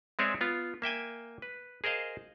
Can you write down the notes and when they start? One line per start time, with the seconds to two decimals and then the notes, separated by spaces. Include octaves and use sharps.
0.19 G#3 C4 G#4 C#5 D5 E5
0.41 B3 F4
0.82 A#3 E5 G5 G#5
1.42 B4
1.84 G#4 A#4 C5 D#5 F5